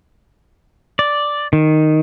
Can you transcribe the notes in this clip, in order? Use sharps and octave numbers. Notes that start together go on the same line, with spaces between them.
D5
D#3